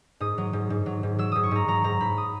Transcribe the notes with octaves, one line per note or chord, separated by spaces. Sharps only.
G#2 D#6
F#3
G#2
G#2
F#3
G#2
F#3 E6
G#2 D#6
C#6
G#2 A#5
F#3 A#5
G#2 A#5
G#2 B5
D#6